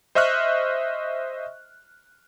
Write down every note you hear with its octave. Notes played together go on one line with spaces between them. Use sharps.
C5 D#5 E5 C#6 F6 F#6